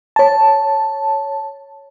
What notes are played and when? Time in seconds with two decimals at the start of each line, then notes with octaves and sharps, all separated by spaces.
0.16 C#5 A5